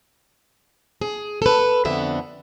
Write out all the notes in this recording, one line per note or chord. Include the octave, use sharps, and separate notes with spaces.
G#4
A4 B4
F2 D3 B3 E5